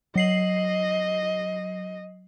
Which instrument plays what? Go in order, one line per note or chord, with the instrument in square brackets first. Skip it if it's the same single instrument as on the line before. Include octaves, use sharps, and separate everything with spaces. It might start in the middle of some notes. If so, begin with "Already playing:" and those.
[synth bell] F#3 C7 F#7 [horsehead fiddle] D#5